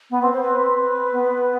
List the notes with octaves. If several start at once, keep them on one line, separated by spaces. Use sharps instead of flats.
B3
C4 B4
C5
B4
B3